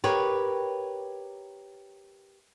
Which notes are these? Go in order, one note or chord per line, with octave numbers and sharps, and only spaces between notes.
G4 A#4 B4 C#5